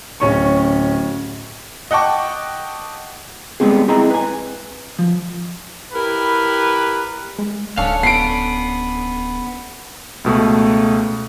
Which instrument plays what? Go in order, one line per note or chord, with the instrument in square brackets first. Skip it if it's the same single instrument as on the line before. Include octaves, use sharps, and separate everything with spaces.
[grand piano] D1 C#4 C#6
[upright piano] D#5 F#5 G5 A5 C#6 D6
[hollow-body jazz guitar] G3 G#3 B3 C4 G#4
C4 E4 G#4 D#5 A#5
B4 G#5
F3
[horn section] E4 G4 A#4 B4
[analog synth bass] G#3
[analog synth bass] D1 [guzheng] C#4 D4 A4 [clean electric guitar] C#5 F5
[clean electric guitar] B3 [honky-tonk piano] C7 D7
[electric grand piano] C#2 B2 A3